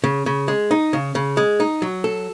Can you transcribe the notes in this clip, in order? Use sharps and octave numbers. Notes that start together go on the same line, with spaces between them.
C#3
C#3
G#3
D#4
C#3
C#3
G#3
D#4
F#3
A4